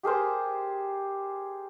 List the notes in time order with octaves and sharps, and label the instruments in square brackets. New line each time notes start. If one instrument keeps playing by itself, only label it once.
[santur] G4 G#4 A#4 C5